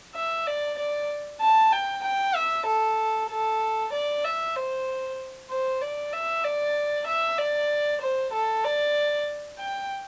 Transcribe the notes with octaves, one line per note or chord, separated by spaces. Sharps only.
E5
D5
D5
A5
G5
G5
E5
A4
A4
D5
E5
C5
C5
D5
E5
D5
E5
D5
C5
A4
D5
G5